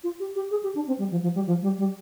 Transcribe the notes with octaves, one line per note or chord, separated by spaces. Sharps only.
F4
G4
G4
G#4
G4
D4
C4
G3
F3
F3
G3
F3
G3
G3